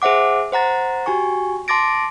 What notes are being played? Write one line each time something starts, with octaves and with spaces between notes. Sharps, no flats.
G#4 C5 E5 F#5 D6
C5 F#5 A#5 A6
F#4 G4 G#5 C#6
A5 C6 D6 A6 A#6 D7